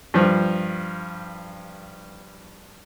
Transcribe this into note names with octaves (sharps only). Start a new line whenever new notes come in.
G2 F3